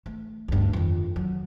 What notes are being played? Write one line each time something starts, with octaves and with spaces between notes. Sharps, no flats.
A3
D2 G2
F2 D#3
F#3